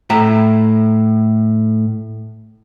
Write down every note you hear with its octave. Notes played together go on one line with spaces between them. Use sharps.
A2 E5 A#5